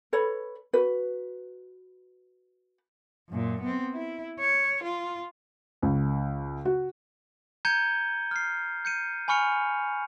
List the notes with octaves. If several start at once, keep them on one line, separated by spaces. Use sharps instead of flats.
A4 B4 C#5 B5
F#4 B4
F#2 A#2
B3 C4
E4
C#5
F4
C#2
F#4
A#5 G6 G#6 C#7 D#7 G7
F6 C7
G6 C#7 D#7
G#5 B5 C#6 F6 C#7 F7